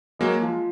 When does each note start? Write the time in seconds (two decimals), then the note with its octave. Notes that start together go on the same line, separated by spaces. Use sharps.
0.19 F#3 G#3 A#3
0.42 F3